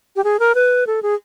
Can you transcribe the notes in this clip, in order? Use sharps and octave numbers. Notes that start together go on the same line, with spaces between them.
G4
G#4
A#4
B4
A4
G#4